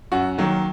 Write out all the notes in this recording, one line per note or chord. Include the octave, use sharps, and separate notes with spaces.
F#2 F#4
D#3 F#3 A#3